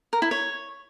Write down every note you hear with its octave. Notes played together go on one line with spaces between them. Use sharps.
A#4
E4
C#5